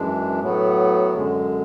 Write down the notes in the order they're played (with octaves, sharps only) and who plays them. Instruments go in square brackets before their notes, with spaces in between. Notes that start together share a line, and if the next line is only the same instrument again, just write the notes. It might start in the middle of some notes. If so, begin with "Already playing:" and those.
Already playing: [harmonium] F#2 E3 G#3 D4
A2 F#3 B3
F#2 D3 G#3